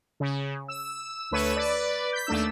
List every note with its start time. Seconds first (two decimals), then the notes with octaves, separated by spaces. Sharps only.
0.20 C#3
0.68 E6
1.31 D2 A3 B4 C#5 E6 D#7
1.56 B4 D5
2.13 G6 B6
2.27 D#2 A3 D4 E6